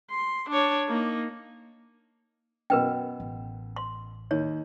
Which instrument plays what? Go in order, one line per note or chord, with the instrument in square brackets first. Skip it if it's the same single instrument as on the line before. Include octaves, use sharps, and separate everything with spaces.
[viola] C6
D4 C#5
A#3 D#4
[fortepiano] F#2 B2 [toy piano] A#4 B4 G5
[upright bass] A1
[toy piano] C6
[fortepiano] D#2 [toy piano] C#5